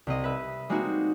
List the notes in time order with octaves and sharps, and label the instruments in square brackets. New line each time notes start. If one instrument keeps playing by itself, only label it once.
[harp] C2 C4 D#5
B4 E5
G3 G#3 A#3 C4 D#4 F#4